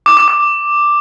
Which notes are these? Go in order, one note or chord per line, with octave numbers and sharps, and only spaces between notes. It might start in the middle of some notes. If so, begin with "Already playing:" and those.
D6
D6
D6